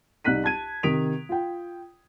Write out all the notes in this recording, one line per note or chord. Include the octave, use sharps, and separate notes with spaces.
C2 D#4 F#6 B6 D#7
A5 F#6 G#6 D#7
C3 D#3 D#6 B6 D7 F7
F4 G5